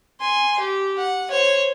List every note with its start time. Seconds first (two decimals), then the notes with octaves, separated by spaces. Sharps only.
0.21 G#5 C6
0.59 G4
0.98 F#5
1.31 C5 C#5